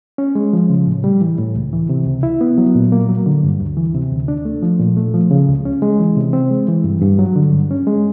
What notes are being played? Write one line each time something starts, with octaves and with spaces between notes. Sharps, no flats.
C#4
G#3
F3
C#3
A2
G3
E3
A2
C#2
E3
C3
C#2
E4
B3
F#3
A#2
A#3
F#3
D3
G2
D2
E3
C3
D2
D4
A3
F3
A#2
A3
F3
C#3
C#2
C#4
G#3
E3
C3
C4
G#3
E3
G2
G2
F#3
D3
G2
C#4
G#3